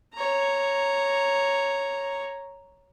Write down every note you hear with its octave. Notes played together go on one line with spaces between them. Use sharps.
C#5 A#5